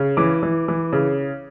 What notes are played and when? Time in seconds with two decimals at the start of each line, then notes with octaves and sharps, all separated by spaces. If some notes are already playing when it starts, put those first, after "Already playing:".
Already playing: C#3
0.17 E3 D6
0.43 E3
0.68 E3
0.93 C#3